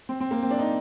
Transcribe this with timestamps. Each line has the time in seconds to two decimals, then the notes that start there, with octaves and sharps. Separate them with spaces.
0.09 C4
0.20 C4
0.31 A#3
0.43 C4
0.51 D4
0.59 D#4